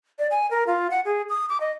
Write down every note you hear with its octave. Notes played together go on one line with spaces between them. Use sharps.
D5
G#5
A#4
F4
F#5
G#4
D#6
D6
D#5